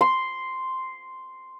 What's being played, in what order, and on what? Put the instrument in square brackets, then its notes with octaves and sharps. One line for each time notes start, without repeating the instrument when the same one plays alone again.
[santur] C6